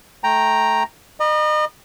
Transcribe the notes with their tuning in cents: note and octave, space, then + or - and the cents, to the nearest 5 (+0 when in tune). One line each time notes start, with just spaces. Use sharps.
A3 -15 G5 +0 A#5 +0
D#5 -35 A#5 +45